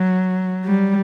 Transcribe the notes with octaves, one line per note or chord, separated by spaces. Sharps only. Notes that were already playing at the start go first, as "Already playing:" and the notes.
Already playing: F#3
G3